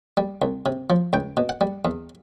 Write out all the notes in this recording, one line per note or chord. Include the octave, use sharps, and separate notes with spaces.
G3
C2
C3
F3
C#2 G5
B2
F#5
G3
E2